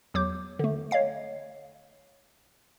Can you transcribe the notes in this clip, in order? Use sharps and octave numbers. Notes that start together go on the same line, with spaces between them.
E2 F#3 D6 G6
D3 A3
C#5 D#5 F5 C7